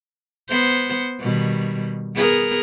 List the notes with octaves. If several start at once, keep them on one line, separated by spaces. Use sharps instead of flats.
B3 C5
B2 D#3 G3
B3 G#4 A#4